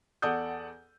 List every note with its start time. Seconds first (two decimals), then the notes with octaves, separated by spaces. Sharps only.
0.22 E2 A4 D5 F#5 D#6 G6